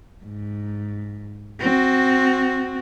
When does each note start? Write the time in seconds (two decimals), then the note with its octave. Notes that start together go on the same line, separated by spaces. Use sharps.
0.25 G#2
1.60 C4 F#4